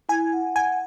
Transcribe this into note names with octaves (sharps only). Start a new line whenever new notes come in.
E4 G#5
F#5
F#5 G#5